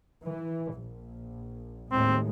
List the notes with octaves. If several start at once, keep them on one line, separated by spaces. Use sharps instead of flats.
E3
A#1
D#2 A2 G#3 C4